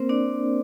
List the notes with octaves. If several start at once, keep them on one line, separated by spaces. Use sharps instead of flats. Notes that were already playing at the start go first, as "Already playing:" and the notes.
Already playing: A#3 C4 A#4 C5
D4 D5